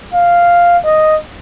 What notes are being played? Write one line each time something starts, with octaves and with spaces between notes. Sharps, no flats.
F5
D#5